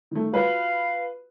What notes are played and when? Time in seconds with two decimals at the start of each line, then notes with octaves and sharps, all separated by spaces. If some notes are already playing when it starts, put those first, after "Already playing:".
0.11 D#3 A3
0.32 F4 F#4 B4 F5